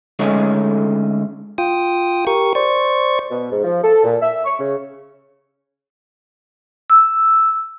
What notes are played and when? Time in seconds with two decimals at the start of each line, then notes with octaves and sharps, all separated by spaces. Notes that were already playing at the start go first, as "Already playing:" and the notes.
0.19 D3 G#3 A3 C#4 D#4
1.58 F4 G5 D#6
2.27 G4 A#4 C#6
2.55 C5 D5 C#6
3.30 B2
3.52 G#2
3.64 F3
3.83 A4
4.04 A#2
4.22 E5
4.45 C#6
4.59 C#3
6.90 E6